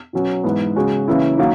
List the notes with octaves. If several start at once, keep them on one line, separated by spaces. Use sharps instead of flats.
B2 F#3 C#4
G#2 E3 B3
C#3 G#3 C#4 F#4
C#3 E3 A#3 C#4 E4
D#3 F#3 A#3